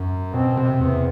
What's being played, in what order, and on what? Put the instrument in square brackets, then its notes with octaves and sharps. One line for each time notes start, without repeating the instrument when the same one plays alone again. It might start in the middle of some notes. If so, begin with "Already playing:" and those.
Already playing: [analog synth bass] F#2
[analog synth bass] B2 [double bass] C4
[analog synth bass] C3
[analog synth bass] E2 [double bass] B3